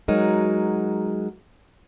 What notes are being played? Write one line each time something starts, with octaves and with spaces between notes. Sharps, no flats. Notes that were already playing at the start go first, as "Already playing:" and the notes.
F#3 G#3 D#4 F#4 A#4